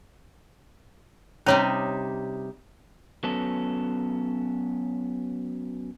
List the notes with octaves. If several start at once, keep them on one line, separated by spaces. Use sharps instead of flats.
C3 G3 C#4 D#4 C#5
F#3 B3 C#4 A4